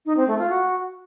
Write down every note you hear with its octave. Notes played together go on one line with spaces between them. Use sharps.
D#4
C4
A3
F4
F#4